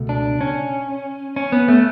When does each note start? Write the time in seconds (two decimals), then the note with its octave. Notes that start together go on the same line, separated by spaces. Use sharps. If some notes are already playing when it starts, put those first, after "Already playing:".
Already playing: C#2 B2 A3
0.09 D4
0.41 C#4
1.36 C#4
1.52 B3
1.68 A3